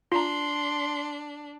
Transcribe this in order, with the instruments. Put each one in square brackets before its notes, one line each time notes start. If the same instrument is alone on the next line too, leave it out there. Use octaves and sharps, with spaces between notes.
[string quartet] D4 [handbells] F4 A#5 [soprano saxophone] C6